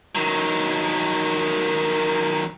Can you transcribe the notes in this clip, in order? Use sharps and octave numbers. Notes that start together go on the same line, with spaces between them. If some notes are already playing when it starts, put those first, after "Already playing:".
D#3 F#3